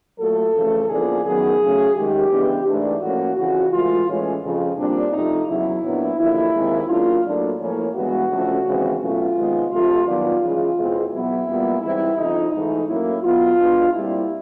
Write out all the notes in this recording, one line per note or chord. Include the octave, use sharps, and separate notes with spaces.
A#2 F#3 A3 A4
F2 C#3 E3 A3
E2 C#3 F3 A#3 D4 G#4
F#2 D#3 F#3 B3 G#4
C#3 F#3 A3 C#4
F#2 D#3 G#3 G4
C#3 E3 G#3 B3 D4
G#2 E3 A3 D4
A2 F3 A#3 C#4 F#4
F2 C#3 E3 F#4
A2 E3 G#3 F4
A2 E3 G#3 C#4
F2 C#3 F3
A#2 G3 C4 D4
C3 F3 A3 D#4
E2 C#3 F#3 E4
A#2 F#3 B3 D4
D#2 D3 F3 E4
D#2 D#3 G#3 C4
C#3 F#3 A#3 D4 F4
A2 F#3 A#3 D4
A2 F3 A#3 C#4
G2 E3 G#3 B3 F#4
D2 C#3 F3 A3 C#4
D#2 C#3 E3 G#3 C4
B2 F#3 A3 C#4 F4
C3 D#3 G#3 B3
D2 C3 F3 A3 F4
G2 D#3 F#3 B3 D4 F4
C#3 E3 G#3
E2 B2 G#3 C4
E2 B2 F#3 B3 E4
A#2 G3 B3
G#2 E3 G3 C4 E4
F2 C#3 F3 D#4
G#2 E3 A3 D#4
A2 F#3 A#3 C#4 E4
B2 F#3 B3 F4
B2 G#3 B3 D4
A#2 G3 C4 E4